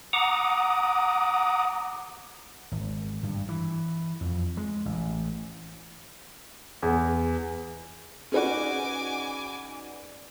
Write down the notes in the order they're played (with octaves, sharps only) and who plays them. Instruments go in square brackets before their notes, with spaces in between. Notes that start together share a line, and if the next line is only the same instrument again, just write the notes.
[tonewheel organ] F#5 A#5 D6 D#6
[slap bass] G#1
G2
E3
F2
G#3
A1
[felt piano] E2
[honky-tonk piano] C#4 D#4 F#4 [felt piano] G#4 B4 D5 [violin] G#5 D6